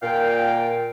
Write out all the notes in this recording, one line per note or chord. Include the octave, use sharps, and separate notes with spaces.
A#2 F5 G5